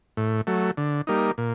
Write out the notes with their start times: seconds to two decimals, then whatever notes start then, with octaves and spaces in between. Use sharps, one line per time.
0.17 A2
0.47 F#3 A3
0.77 D3
1.07 G3 A#3 D#4
1.38 A#2